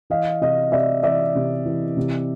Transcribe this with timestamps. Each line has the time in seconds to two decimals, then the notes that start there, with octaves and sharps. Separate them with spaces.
0.10 E3 D#5 F5
0.41 C3 D#5 F5
0.72 C3 D5 E5
1.03 E3 D5 E5
1.35 C3
1.66 E3
1.97 C3